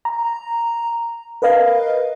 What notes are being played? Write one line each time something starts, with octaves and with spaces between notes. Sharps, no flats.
A#5
A#4 B4 D#5 F5